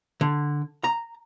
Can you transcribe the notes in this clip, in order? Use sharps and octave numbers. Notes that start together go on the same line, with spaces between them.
D3
A#5